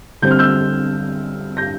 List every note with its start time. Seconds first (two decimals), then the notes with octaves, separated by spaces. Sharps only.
0.22 D3 G3 C4 G6
0.31 F6
0.39 E6 G6
1.57 G6 A#6